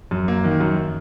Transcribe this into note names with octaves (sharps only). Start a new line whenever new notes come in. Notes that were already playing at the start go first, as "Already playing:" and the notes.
F#2
A#3
D#3
F#2